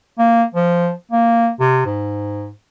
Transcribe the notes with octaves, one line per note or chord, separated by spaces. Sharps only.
A#3
F3
A#3
C3
G#2